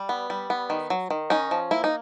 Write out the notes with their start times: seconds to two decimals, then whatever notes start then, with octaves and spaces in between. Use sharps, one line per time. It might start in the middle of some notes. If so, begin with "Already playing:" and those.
Already playing: G3
0.09 B3
0.30 G3
0.50 B3
0.70 D#3
0.90 F#3
1.10 D#3
1.30 C#4 D#4
1.51 F3
1.71 A#3 E4
1.84 D#4